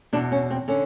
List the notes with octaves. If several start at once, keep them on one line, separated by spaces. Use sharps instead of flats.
E2 B2 D4
C#4
C4
D3 C#4